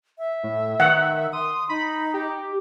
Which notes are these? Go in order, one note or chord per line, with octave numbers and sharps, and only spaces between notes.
E5
A2
D#3 F#5
C6 D#6
D#4 B5
G4